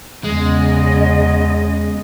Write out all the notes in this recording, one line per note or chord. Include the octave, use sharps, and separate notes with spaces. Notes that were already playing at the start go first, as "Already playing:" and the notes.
E2 C#3 G#3 D#5